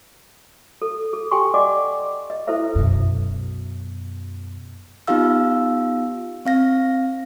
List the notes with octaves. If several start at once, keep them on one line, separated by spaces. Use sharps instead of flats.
A4
G#4 A4
G4 G5 G#5 C6 C#6
D5 D#5 F#5 G#5 D6
D#5
E4 A4 B4 C5 E5
F#2 B2
B3 D#4 F4 G4 F5 E6
C4 F5 A#6